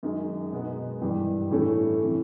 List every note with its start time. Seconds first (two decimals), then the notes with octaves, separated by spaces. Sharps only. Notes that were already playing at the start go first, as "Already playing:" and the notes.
0.03 F#2 D#3 G#3
0.52 B2 G#3 B3 D#4
1.02 G2 E3 G3
1.51 A2 E3 A3 C#4 E4
2.02 C3 E3